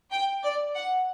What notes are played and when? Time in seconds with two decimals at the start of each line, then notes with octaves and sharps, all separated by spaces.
0.12 G5
0.43 D5
0.75 F#5